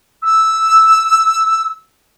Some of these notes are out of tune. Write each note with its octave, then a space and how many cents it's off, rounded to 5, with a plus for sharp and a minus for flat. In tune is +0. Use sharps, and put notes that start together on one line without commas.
E6 -5